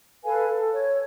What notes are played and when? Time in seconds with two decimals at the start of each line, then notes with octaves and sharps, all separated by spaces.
0.25 A4 B4 F5 G#5
0.49 A4
0.72 C#5